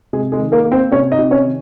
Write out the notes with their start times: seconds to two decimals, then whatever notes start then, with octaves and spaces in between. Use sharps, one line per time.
0.13 C3 G#3 G#4
0.32 G#3 G#4
0.39 D#3
0.52 A#3 A#4
0.65 A#3
0.72 C4 C5
0.92 C3 C#4 C#5
1.11 D#4 D#5
1.18 C3
1.31 C#4 C#5
1.45 D#3